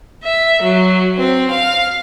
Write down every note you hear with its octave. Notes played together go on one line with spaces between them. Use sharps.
E5
F#3
C4
F5